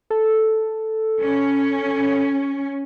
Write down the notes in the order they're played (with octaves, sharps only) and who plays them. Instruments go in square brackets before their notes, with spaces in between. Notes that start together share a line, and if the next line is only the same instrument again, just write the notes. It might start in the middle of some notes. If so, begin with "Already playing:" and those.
[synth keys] A4
[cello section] C#4